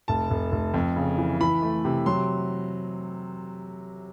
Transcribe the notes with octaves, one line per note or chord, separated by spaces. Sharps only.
F1 A5
F1
F1
F2
C#3
E3
E3 B5
A3
C3
F#3 C6